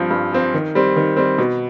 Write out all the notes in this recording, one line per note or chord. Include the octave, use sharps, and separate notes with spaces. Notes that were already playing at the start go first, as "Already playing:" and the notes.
Already playing: G2 F3 C4
G2
F3 C4
D#3
G3 C4
D#3
G3 C4
B2